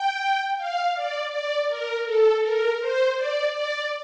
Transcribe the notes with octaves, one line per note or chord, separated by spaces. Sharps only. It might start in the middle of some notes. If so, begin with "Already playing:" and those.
Already playing: G5
F5
D5
D5
A#4
A4
A#4
C5
D5
D5